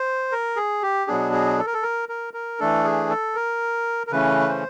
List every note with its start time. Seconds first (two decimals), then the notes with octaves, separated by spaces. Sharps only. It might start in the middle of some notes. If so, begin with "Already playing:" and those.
Already playing: C5
0.32 A#4
0.56 G#4
0.83 G4
1.07 B2 F#3 B3 D4 G#4
1.33 G#4
1.58 A4
1.66 A#4
1.74 A4
1.83 A#4
2.09 A#4
2.34 A#4
2.60 E3 A3 D4 A4
2.84 G#4
3.10 A4
3.35 A#4
4.07 A#4
4.11 C#3 E3 A3 C#4 B4
4.49 C5